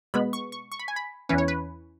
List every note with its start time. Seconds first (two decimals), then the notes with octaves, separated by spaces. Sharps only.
0.14 B2 G#3 B3 B5
0.33 C#6
0.52 C#6
0.72 C#6
0.79 B5
0.88 G#5
0.96 B5
1.29 E2 E3 C#4 B4
1.38 C#5
1.48 B4